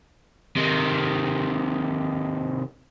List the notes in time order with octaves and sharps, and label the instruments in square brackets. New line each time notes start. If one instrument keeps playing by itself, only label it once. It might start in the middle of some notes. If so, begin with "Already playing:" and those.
[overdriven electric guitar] C3 D#3